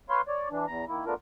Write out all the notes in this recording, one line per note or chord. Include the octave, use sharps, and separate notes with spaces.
B4 C#5 F5 C6
C#5 D5
E3 D4
E2 A#5
D#3 A#3 E4
A3 B3 D4 F4 A#4